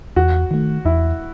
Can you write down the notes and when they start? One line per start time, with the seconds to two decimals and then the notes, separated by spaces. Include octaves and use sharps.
0.16 E2 F#4
0.51 D#3 A3
0.85 E2 E4